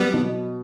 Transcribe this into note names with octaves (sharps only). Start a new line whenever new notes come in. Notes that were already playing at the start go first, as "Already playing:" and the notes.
Already playing: F#3 G3 B3
B2